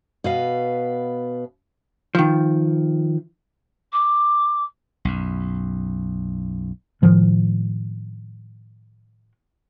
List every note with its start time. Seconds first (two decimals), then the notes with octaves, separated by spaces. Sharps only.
0.24 B2 B4 F5
2.15 D#3 F3
3.92 D6
5.05 B1 F#2
7.02 A2 D#3 F3 G#3